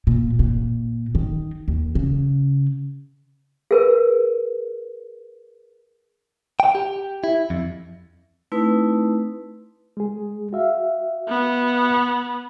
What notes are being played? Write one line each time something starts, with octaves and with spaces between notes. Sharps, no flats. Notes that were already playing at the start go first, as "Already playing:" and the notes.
A#2
A#2
D#3
D#2
C#3
G#4 A#4 B4
G5
G4
E4
F2
A3 C4 D#4 E4 B4
G#3 G#4
F#4 E5 F5
B3